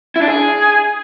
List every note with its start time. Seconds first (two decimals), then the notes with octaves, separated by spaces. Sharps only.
0.16 E4
0.22 D4
0.28 G#4